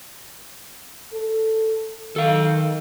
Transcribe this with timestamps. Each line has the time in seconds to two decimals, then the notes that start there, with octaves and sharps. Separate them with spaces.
1.13 A4
2.16 D#3 A4 F5